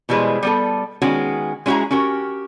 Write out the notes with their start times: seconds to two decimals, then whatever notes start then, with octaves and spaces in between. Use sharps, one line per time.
0.09 B2 E3 G3 G#3 B4 C5
0.43 G3 B3 A4
1.02 D#3 G#3 B3 C#4 F#4
1.66 G#3 C#4 E4 F#4 G#4 A#5
1.91 C#4 F#4 G4 A#4